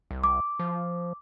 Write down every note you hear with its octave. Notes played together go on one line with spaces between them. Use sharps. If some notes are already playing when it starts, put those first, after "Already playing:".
C2
D6
F3